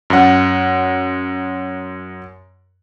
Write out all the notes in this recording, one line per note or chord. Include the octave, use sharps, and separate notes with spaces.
F#2 F#5